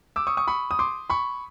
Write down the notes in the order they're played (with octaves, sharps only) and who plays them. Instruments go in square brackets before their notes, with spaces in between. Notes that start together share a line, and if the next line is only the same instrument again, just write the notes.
[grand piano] D6 E6
C#6 D#6
C#6 D#6
B5 C#6
D#6
C6 D6
B5 C#6